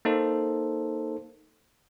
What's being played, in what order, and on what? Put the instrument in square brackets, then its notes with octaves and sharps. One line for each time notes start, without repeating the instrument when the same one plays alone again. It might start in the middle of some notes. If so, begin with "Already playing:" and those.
[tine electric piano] A#3 D#4 A4 C5